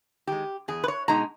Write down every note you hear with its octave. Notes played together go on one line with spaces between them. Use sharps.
D#3 G#3 G4
E2 G#4
B4
C#5
B2 G#3 D#4 A#5